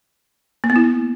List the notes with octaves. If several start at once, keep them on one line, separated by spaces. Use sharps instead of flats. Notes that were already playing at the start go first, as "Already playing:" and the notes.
A#3
B3
E4